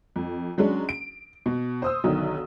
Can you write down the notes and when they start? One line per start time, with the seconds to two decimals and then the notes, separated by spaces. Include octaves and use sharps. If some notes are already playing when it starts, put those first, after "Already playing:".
0.16 F2
0.58 F#3 G#3 C#4 D4
0.89 D7
1.46 B2
1.82 C5 D#6 E6
2.04 B1 D3 D#3 F#3